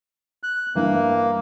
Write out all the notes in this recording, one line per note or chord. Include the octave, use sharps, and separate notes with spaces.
F#6
G2 E3 A#3